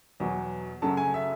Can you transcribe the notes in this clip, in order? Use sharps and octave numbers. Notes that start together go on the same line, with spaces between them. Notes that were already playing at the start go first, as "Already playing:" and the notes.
E2 B2 F#3
F#2 C#3 F#3 A3 A5
G#5
E5